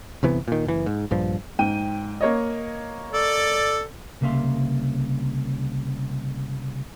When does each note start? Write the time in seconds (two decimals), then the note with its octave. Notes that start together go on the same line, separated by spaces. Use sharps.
0.23 G1 C3 E3 B3
0.48 A#2 D#3
0.65 F#1 E3
0.86 G#2
1.11 A#1 G2 F3
1.59 G#2 G5 D#7
2.21 A#3 C#5 D#5
3.13 A4 D5
4.21 C2 C#3 A#3 E5 F5 C6